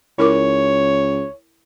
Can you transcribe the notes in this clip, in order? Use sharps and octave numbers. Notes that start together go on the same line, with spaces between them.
C#2 E4 A#4 C#5 D6